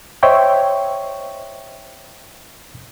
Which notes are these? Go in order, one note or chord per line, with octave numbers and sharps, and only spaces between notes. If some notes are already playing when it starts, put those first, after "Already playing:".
C5 C#5 D#5 E5 G5 C#6